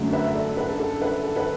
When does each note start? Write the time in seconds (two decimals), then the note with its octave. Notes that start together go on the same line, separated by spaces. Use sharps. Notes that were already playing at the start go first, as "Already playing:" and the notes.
Already playing: F#2 D3 F#3 A3
0.13 B4 E5
0.24 E5
0.35 A4 D5
0.57 B4
0.68 A4
0.80 A4
1.02 B4
1.24 A4
1.36 B4